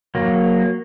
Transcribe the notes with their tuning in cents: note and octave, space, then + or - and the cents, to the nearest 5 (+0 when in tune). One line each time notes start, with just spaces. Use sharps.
F#3 -10 A#3 +0